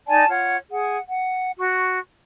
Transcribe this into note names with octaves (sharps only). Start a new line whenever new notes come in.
D#4 D5 G#5 A5
F4 C#5 F#5
G#4 F#5
F#5
F#4 C#6